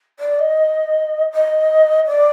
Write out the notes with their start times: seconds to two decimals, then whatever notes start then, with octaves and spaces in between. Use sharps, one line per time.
0.19 D5
0.38 D#5
1.32 D#5
2.06 D5